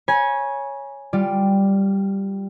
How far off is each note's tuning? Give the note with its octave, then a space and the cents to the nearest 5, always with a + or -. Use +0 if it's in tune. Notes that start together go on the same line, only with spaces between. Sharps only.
C#5 +0 G#5 +0 B5 -45
G3 +0 F4 +0 D5 +0